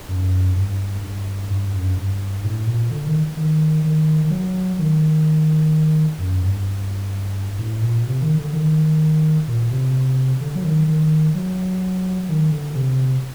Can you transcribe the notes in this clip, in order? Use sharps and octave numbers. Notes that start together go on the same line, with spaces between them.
F#2
G2
G2
G2
F#2
G2
A2
A#2
D3
D#3
D#3
D#3
D#3
F#3
D#3
F#2
G2
A2
A#2
C3
D#3
D3
D#3
A#2
C3
D3
F#3
D#3
D#3
F#3
D#3
D3
C3